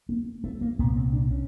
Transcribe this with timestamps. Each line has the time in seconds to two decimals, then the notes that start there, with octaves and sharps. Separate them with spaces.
0.09 A#3
0.44 A3
0.61 A#3
0.79 C2 A#2 B3
0.96 C4
1.13 D4
1.31 C#4